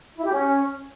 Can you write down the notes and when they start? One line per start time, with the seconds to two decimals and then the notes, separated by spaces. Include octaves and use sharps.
0.16 E4
0.24 G4
0.32 C#4